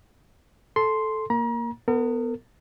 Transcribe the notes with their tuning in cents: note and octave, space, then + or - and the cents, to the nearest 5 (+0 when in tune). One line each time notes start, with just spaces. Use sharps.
A4 -10 C6 +0
A#3 +0 A#5 +35
B3 +0 A#4 -45